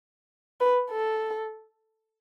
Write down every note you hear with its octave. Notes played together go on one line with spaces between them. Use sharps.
B4
A4